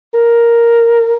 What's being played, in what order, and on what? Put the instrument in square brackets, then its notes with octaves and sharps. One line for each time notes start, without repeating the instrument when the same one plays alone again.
[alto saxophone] A#4